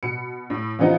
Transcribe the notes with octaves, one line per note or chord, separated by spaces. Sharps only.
B2 B5 C#7
A2
C#3 E3 F3 B3 D#4